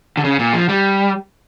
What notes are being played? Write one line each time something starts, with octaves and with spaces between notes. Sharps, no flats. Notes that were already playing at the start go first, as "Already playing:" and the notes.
D3
C#3
A#2
F3
G3